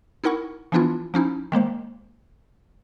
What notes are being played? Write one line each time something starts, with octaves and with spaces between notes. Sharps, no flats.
D#4 E4 A#4 F#5 C#6
E3 F3 B3 D4 E4 F4
F3 C#4 D#4 E4
D#3 G#3 A#3 C5